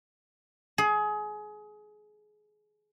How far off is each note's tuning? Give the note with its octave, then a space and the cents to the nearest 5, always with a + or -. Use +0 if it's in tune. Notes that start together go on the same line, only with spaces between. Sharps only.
G#4 +25